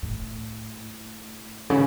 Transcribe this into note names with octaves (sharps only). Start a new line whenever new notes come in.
A2
C#3